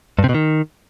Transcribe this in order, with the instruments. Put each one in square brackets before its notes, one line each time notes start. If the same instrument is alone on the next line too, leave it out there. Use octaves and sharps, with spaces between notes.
[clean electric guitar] G2
C3
B2
D#3